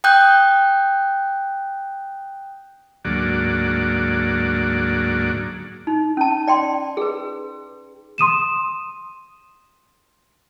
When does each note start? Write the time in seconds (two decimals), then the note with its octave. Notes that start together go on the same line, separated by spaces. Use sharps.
0.04 G5 D#6 F#6 G6
3.05 D2 G#2 F#3 A#3 F#4 D5
5.87 D#4
6.17 C#4 A5
6.48 D5 G5 C6
6.97 G#4 B4
8.18 C6 D#6 D#7 E7